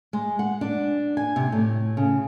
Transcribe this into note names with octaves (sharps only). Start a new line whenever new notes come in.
G#3
F#5
D4
G#5
C3
A2
C#3